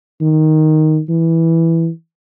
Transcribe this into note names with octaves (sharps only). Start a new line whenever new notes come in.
D#3
E3